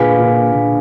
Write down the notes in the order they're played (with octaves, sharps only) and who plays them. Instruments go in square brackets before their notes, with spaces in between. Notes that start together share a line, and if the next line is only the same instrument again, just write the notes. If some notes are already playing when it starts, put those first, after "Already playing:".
Already playing: [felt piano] A#2 D3 [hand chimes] F4 G#4 B4 F5 G#5
[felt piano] A#2 D3
A#2 D3